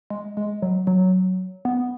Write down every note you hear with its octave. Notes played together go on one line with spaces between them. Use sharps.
G#3
G#3
F#3
F#3
B3